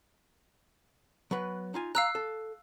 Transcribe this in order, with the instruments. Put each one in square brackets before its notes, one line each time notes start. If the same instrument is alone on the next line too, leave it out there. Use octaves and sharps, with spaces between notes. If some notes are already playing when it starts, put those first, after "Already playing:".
[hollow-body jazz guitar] F#3 B3 B4
D#4 F4 G#5
[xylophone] F5 E6 F#6 [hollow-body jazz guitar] A#5
[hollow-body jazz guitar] A4